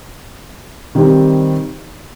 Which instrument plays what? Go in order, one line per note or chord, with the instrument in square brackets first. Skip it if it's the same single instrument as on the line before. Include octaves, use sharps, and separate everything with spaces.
[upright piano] D#3 G3 C4 D#4 G4